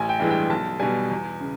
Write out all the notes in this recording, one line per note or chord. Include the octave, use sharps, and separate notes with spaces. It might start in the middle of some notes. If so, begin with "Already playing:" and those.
Already playing: A1 G#5
G5
G2 E3 G#3
G5
B1 A5
B2 G3 G#5
E2
C#3